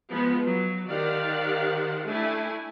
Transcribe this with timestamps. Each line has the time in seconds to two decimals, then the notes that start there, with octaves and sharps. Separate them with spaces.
0.11 F3 G#3 B3
0.46 F#3
0.89 D#3 G4 C5 D5 F5 F#5
2.05 A3 D4 E4 G#5